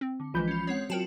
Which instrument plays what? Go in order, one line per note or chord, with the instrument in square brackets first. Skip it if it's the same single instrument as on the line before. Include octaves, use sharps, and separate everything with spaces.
[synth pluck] C4
[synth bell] D3
[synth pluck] A#1 E3 G#3 [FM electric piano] F3 B5 G6
[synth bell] C#4 F4
[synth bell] G#3 C4 F#5 [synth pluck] C#5
[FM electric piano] F#3 [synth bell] F4 F#4 A5 [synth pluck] A#4 G5 E7